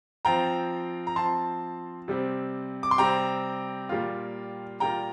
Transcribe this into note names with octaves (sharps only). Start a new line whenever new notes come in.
F3 C4 F4 G5 A#5
A#5
F3 C4 F4 A5 C6
C3 G3 C4
D6
C6
C3 G3 C4 G5 A#5
A#2 G3 A#3 F4
A#2 G3 A#3 F4 G5 A#5